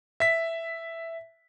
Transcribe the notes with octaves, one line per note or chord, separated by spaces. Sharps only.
E5 B6